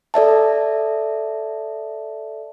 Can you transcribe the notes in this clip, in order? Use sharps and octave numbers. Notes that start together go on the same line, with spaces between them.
A4 D5 E5 A5